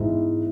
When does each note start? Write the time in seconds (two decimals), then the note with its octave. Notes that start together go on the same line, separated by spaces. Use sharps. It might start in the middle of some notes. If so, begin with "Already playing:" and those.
Already playing: G#2 B3 E4